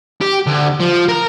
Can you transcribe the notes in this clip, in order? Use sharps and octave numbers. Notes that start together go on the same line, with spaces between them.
G4
D2
F3
A#4 A#5